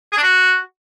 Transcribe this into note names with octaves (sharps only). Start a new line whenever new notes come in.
G#4
D4
F#4